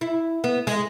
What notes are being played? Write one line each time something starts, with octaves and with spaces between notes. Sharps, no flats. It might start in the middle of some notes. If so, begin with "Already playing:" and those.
E4
B3
G#3